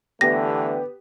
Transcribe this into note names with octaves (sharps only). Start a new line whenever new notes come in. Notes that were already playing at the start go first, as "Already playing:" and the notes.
D3 E3 A3 B3 G4 A#6